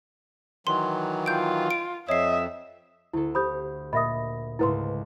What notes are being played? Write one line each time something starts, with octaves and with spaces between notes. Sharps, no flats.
D#3 E3 F#3 C6
F4 G5 G6 D7
D7
F2 C#5 D#5 E5 C7
D2 E4 A4
G4 C5 B5 D#6 G6
A#2 D#5 E5 B5 D#6 A#6
C#2 G#2 A3 E4 B4 C6